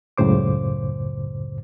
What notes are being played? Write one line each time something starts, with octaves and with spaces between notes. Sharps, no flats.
C#2 F#2 A2 C#3 C5 D6